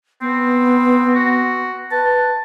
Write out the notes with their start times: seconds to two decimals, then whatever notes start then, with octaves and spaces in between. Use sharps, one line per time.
0.21 B3 C4
1.15 F#4
1.91 B4 A5